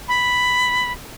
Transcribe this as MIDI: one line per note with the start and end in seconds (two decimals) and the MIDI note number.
0.08 0.92 83